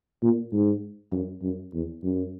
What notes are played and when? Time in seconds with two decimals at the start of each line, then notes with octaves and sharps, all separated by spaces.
0.22 A#2
0.52 G#2
1.12 F#2
1.42 F#2
1.73 E2
2.03 F#2